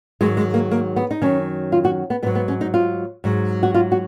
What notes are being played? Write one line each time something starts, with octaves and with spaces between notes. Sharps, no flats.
G#2 D#3 F#3 G#3
G#3
A#3
A#3
B3
D#4
F#2 D#3 F#3 C#4
F4
F#4
B3
G#2 F#3 B3
B3
C#4
D#4
F4
G#2 F#3
F#4
F4
F#4